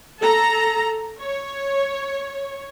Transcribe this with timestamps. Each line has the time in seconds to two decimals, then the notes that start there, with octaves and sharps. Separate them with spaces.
0.20 A4 A#5
1.19 C#5